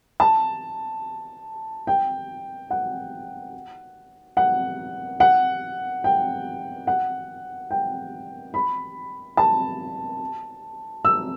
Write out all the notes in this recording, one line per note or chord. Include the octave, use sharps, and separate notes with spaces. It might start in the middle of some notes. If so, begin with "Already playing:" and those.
A5
G5
F#5
F#5
F#5
G5
F#5
G5
B5
A5
E6